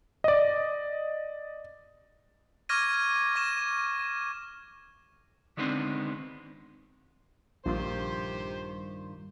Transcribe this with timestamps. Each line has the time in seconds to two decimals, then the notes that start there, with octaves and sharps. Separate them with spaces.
0.24 D5 D#5
2.69 C#6 D6 F6 G#6 A#6 D#7
3.35 C#6 A#6 E7
5.57 D3 D#3 G#3 B3 C4 D4
7.66 A#1 G2 D#3 F4 G4 C5